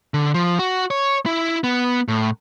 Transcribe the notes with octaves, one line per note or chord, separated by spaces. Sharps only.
D3
F3
F#4
C#5
E4
B3
A2